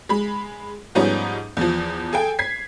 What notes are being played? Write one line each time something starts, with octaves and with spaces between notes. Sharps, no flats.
G#3 B5
G#2 F3 G3 B3 C#4 D#4
E2 F3
G#4 A4 G5
G#6 B6 C7